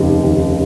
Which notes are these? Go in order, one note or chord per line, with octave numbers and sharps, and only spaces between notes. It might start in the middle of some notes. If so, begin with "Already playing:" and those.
Already playing: F1 D#2 C#3
D#2